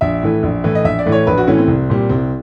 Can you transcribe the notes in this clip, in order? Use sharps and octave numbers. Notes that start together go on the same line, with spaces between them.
A#1 E5
A2 E3 A3
A#1
A2 E3 A3
D#5
A#1 E5
D5
A2 E3 A3
C#5
A#1 B4
F#4
A2 E3 A3 C#4
C4
C2
A#2 G3
C2 C4